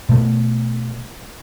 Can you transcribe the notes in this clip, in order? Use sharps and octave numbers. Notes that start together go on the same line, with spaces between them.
B2 A3